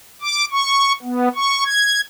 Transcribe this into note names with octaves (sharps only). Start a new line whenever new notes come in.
D6
C#6
B3
C#6
G#6